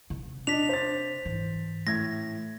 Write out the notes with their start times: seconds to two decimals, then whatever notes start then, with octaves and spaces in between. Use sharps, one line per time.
0.10 C3
0.47 D4 D#5 B6 F7
0.69 C5 A6
1.25 G#2 E3
1.87 A2 G#6 A#6